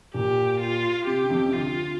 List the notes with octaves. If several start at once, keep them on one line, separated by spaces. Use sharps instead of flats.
A#2 A#3 G4
F4
C3 G4
D3
F2 F3
C3
D2 D3 F4